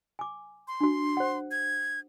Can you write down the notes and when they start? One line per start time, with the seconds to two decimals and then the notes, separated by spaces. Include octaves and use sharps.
0.19 G#5 D6
0.68 C6
0.81 D4 F#4
1.17 C5 F#5
1.51 G#6